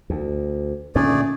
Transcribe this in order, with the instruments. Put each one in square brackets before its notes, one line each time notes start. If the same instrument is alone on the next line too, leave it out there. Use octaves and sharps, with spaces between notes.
[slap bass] D2
[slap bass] A#2 D3 D#3 [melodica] A3 G#4 D5 [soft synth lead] C#4